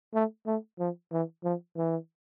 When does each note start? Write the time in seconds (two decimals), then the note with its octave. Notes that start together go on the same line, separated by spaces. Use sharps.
0.14 A3
0.46 A3
0.79 F3
1.12 E3
1.44 F3
1.77 E3